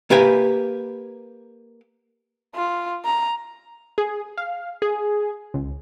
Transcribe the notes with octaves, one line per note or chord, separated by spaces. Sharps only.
A#3 G4 B4 G#5
F4
A#5
G#4
F5
G#4
C#2